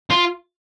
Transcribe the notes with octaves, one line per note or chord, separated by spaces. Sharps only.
F4